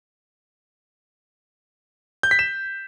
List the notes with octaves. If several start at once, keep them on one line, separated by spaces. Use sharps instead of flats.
G6
B6
E7